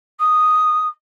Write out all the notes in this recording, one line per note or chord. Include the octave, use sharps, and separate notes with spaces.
D#6